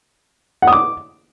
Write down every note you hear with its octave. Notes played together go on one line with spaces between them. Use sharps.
F#5
D#6
D6